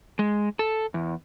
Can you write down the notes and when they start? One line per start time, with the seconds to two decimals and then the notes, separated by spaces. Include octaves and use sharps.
0.19 G#3
0.59 A4
0.94 E2